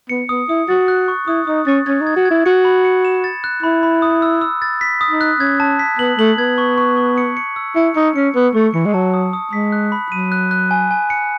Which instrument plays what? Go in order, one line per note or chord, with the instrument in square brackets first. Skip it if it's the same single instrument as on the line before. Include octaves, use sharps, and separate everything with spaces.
[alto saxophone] B3 [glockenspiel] C#7
[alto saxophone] B3 [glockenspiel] D#6
[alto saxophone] E4 [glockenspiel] D#6
[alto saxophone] F#4 [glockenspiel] A6
[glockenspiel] F#6
C#6
[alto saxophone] E4 [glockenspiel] D#6
[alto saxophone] D#4 [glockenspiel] D#6
[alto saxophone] C#4 [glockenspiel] A6
[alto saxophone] C#4 [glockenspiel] G#6
[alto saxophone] D#4
[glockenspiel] G#6
[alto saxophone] F#4
[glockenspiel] G#6
[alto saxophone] E4
[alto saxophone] F#4 [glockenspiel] C#7
[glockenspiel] B5
C#7
E7
A6
F#6
[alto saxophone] E4 [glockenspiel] B5
[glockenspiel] B5
D#6
E6
E6
A6
B6
D#6
[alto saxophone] D#4
[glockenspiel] F#6
[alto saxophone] C#4 [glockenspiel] G#6
[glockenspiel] A5
B6
[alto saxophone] B3 [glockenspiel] F#7
[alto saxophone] A3 [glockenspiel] F#7
[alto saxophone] B3 [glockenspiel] G#6
[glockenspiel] C#6
C#6
C#6
C#7
C#7
E6
[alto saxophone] E4 [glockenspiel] C#7
[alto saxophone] D#4 [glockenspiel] C#7
[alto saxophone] C#4 [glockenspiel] C#7
[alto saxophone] B3 [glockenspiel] C#7
[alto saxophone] A3 [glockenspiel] C#6
[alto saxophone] E3 [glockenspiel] C#7
[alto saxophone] G#3
[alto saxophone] F#3 [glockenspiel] A5
[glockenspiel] D#6
D#6
[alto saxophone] G#3 [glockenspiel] B6
[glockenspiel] F#6
B5
[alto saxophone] F#3 [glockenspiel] D#7
[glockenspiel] F#6
F#6
G#5
G#5
C#7